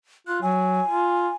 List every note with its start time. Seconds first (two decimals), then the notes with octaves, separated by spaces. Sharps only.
0.27 F4 F#6
0.42 F#3 G#5
0.88 F4